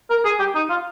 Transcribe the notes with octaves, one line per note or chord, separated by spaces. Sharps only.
A#4
G#4
G4
D#4
F4